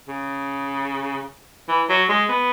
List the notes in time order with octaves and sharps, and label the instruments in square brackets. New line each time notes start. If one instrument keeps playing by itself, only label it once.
[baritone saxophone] C#3
E3
F#3
G#3
B3